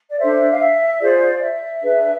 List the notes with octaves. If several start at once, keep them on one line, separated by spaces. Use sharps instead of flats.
D5
D4 A4 C5 E5
F5
E5
F4 G#4 C5 D5
E5
D4 G#4 B4